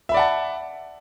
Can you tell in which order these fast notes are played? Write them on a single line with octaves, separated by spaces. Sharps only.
E5 B5 D5 F#5 A5